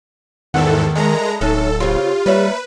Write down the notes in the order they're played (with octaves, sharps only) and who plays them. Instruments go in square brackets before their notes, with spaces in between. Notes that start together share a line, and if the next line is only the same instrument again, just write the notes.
[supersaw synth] E2 G#2 A4 [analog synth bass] D#3 [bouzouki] E4 F#5
[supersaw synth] G#3 A#5 [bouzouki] D4 E4 A4 [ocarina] A#4
[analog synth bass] D1 [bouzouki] G#3 C#4 E5 [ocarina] D#4 [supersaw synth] A4
[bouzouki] C#3 C4 [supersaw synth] F4 [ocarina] G4
[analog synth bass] G3 [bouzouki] A#3 C#5 E5 [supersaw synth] B4